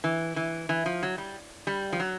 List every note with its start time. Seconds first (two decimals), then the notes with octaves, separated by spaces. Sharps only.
0.04 E3
0.36 E3
0.69 E3
0.86 F3
1.03 F#3
1.18 G3
1.67 G3
1.93 F3
2.00 F#3